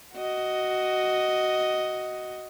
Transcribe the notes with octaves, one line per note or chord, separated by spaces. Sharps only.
F#4 D#5